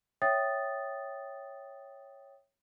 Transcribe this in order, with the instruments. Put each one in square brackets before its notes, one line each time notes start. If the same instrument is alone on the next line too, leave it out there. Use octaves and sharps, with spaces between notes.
[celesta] C#5 E5 G5 D#6 A6